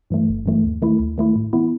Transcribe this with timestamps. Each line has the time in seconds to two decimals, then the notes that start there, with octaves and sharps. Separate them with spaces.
0.10 G2 E3 A3
0.29 G1
0.46 G2 E3 A3
0.64 D#2
0.82 D#3 A3 E4
0.99 D#2
1.18 D#3 A3 E4
1.36 A2
1.53 E3 B3 E4